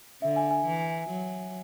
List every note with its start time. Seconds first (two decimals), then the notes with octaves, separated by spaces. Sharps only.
0.22 D3 E5
0.36 G#5
0.51 G#5
0.66 E3
1.10 F#3